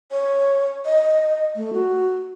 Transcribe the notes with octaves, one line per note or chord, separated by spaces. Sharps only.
C#5
D#5
A3
F#4